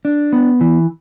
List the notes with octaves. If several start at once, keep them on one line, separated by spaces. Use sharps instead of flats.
D4
B3
E3